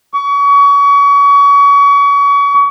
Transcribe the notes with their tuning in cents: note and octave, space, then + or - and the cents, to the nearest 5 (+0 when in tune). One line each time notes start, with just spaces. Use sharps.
C#6 +35